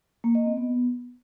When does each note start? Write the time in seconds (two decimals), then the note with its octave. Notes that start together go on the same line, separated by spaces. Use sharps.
0.24 A#3
0.35 D#5
0.46 C4
0.57 B3